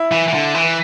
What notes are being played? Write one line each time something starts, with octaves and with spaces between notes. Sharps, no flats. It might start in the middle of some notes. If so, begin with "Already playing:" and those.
Already playing: E4
E3
E3
D3
E3